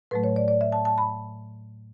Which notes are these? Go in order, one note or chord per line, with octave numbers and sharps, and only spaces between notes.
A2 F#3 A3 B4
C#5
D5
D5
E5
A5
A5
B5